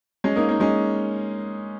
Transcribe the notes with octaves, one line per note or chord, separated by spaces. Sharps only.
G#3 C#4
A#3 D#4
A#3 D#4
G#3 C#4